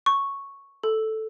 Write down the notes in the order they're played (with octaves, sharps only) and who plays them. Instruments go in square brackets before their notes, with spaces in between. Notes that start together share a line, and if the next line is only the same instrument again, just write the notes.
[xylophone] C#6
A4